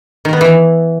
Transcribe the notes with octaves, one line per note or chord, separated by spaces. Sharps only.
D#3
B3
E3